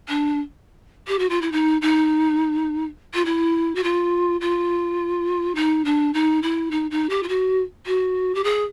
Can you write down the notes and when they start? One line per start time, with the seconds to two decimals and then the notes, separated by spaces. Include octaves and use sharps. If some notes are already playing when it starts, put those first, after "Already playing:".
0.08 D4
1.08 G4
1.19 F#4
1.29 F4
1.41 E4
1.52 D#4
1.81 D#4
3.14 F4
3.25 E4
3.75 F#4
3.83 F4
4.41 F4
5.55 D#4
5.85 D4
6.13 D#4
6.42 E4
6.71 D#4
6.91 D#4
7.09 G4
7.23 F4
7.28 F#4
7.86 F#4
8.35 G4
8.44 G#4